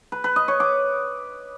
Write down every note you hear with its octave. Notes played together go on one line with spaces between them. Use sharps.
B4
B4
D#5
C#5
D6